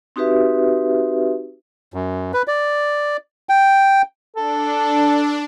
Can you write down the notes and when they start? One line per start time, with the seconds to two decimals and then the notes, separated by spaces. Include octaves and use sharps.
0.16 C4 D#4 F#4 G4 B4 E5
1.94 F#2
2.33 B4
2.48 D5
3.49 G5
4.37 D4 A4